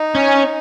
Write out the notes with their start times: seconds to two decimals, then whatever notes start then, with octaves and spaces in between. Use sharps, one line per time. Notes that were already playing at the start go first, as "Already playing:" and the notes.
Already playing: D#4
0.15 C#4